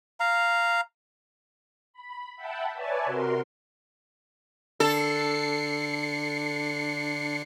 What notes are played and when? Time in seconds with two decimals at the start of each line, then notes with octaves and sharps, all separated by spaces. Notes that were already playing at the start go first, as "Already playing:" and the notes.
0.20 F5 A#5
1.93 B5
2.36 E5 F#5 G5 A5 B5
2.73 B4 C#5 D5 E5 G#5 A5
3.05 C3 F#4 A#4 C6
4.80 D3 D4 A4 C7 C#7